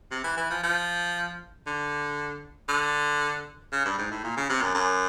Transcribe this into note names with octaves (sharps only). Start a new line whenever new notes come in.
C3
E3
E3
F3
F3
D3
D3
C#3
G2
G#2
A2
A#2
C#3
C3
F#2
F#2